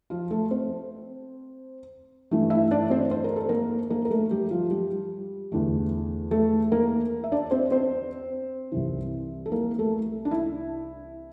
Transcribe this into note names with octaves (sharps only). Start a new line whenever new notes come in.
F3 F4
A3 A4
C4 C5
G2 E3 A3
E4 E5
D4 D5
C4 C5
C5
A#4
A4
A#3 A#4
A#3 A#4
A#4
A3 A4
G3 G4
F3 F4
G3 G4
E2 D3 A3
A3 A4
A#3 A#4
E5
D4 D5
C4 C5
C4 C5
C2 C3 E3
A4
A#3 A#4
A3 A4
D4
E4